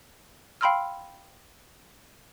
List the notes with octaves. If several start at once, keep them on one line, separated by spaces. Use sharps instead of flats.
F5 G5 B5 C6 E6 F6